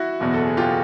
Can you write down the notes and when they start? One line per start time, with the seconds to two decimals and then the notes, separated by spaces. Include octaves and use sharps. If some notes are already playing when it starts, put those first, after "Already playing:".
Already playing: E4 F#4
0.20 F#1 E2 B2
0.34 A4
0.46 G#4
0.57 F4 G4